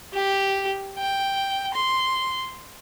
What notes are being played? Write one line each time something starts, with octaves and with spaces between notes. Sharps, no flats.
G4
G5
C6